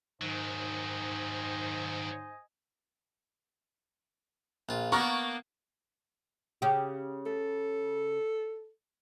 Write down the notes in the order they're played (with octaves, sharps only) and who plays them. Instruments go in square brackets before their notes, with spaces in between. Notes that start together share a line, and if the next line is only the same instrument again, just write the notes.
[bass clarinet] G#2 [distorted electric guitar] D#3 F#3 [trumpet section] C5 D#5 G#5
[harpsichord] A#1 F4
[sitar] A#3 A#4 [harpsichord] B3 D4 [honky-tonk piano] C#6
[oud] C#3 G4
[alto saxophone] A4